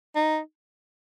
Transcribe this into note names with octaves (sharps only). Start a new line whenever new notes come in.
D#4